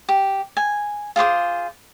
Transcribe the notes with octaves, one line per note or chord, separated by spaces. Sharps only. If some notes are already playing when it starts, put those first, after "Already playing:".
G4
G#5
F4 G#4 C5 D6